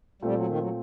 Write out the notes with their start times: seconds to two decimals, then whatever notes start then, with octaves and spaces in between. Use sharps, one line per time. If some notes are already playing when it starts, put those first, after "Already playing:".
0.22 A#2 G3 A3 C4
0.34 F#3
0.47 D#3
0.58 F#3